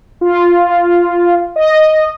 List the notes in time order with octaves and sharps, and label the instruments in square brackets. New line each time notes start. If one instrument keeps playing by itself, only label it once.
[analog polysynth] F4
D#5